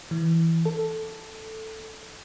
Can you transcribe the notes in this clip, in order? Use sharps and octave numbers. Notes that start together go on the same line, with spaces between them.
E3
A4